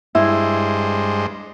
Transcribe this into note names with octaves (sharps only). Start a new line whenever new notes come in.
G2 G#3 E4 C5